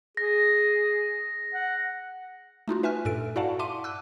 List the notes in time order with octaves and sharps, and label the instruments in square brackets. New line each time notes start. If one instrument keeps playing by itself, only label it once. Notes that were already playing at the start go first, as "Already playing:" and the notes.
[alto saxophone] G#4 [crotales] A#6
[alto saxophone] F#5
[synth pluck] A3 D#4 F4 F#4
B4 E5 G#5 F6 F#6
G2 A#2 A4 D7
E4 F#4 D5 F5 F#5 A5
E5 A5 C6 D6 D#7
E6 F#6